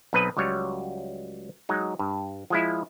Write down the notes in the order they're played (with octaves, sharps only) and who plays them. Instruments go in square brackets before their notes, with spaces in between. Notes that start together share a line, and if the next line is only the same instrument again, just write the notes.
[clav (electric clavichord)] B1 C4 B4 D#5
C#2 F#3 G3 C#5
F#3 G#3 D#4
G2
F3 G#3 E4